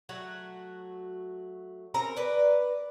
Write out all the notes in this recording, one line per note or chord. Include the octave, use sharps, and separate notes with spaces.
F#3 A3 F#4
C4 C#4 A#4 A#5
B4 D5